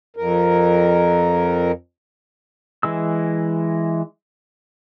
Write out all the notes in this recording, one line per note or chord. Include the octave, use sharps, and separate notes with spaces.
F2 A#4
E3 G#3 E6